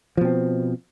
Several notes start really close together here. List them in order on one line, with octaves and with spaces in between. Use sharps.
F3 B2 C4